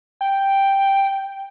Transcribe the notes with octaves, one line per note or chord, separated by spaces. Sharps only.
G5